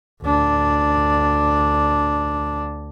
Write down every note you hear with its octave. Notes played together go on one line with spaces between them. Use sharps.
D2 D4